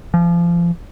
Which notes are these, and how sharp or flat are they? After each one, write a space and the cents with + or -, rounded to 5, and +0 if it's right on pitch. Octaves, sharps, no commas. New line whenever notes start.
F3 -30